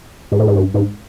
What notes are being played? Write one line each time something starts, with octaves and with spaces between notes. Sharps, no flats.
G#2
A2
G#2
G2
G#2